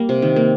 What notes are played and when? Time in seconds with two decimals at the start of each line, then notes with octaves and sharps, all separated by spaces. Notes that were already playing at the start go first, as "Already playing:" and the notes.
Already playing: G3 A#3
0.09 C3
0.22 D#3
0.36 A#3